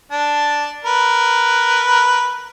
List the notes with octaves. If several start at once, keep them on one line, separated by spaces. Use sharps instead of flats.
D4 A5
A#4 B4